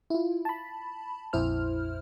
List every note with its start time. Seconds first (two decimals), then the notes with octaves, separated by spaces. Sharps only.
0.10 E4 F4
0.45 A5 B5
1.33 A#1 F2 E4 C5 F6